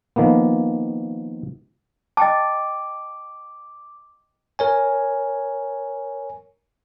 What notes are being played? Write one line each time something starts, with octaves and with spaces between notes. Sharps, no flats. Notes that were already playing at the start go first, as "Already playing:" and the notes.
D#3 F3 A#3 B3
D#5 G5 A5 D6
A#4 C#5 G#5